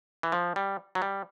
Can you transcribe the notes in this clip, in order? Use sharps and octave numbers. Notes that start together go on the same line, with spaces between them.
E3
F3
G3
F#3
G3